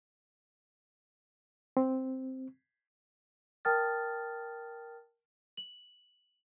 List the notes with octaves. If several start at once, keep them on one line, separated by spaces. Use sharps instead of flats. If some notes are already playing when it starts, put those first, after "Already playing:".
C4
A#4 G5 A5 D#6 F6 A6
F#7